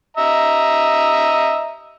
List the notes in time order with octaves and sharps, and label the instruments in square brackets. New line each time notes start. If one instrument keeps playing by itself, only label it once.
[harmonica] D#5 E5 A#5